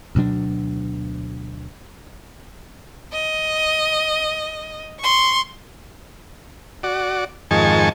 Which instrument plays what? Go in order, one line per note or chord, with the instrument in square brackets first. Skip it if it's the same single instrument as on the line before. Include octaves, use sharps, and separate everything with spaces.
[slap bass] D2 B2 F#3 D4
[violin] D#5
C6 C#6
[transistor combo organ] F#4 D5
F2 G#2 D#3 G#5 A5 C#6